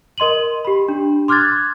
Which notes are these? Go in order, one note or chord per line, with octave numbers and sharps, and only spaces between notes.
A#4 D#5 C6 D#7 F#7
G4 B5
D4
C6 D6 F6 F#6 G#6 A6